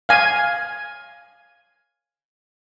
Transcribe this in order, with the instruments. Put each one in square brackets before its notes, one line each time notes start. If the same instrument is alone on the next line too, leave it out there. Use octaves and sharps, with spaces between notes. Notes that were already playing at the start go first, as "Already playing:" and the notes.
[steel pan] F5 G#5